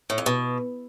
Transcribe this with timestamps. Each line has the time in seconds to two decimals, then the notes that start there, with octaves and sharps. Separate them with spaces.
0.10 A2
0.18 F2
0.26 B2